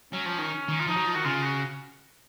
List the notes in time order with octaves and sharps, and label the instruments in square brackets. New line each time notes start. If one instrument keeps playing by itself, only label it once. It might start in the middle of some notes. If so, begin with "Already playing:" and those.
[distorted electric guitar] F#3 [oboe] C#4
[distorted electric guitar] F3
D#3
D#3
[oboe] F4
[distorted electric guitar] F3 [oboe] D#4
[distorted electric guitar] F#3
F3
[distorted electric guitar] D#3 [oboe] F#4
[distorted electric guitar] C#3 [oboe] F4
[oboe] F#4